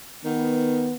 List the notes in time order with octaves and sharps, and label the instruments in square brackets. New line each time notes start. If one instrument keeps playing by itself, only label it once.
[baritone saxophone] D#3 [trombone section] B3